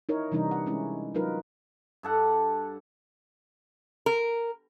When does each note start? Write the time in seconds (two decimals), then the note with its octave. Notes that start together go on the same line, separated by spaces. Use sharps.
0.09 D#4 E4 A#4 C#5
0.32 C3 E3 G3 D4 D#4
0.51 F#5
0.66 G#3 C#4 E4
1.15 F#3 D#4 F4 A#4 B4
2.03 G2 A4 F#5
4.06 A#4